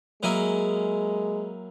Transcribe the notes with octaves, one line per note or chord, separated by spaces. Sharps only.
F#3 G#3 A#3 E4 G#4